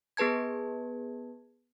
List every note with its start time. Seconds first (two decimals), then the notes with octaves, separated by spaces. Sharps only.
0.17 B3 G#4 B4 A5 G#6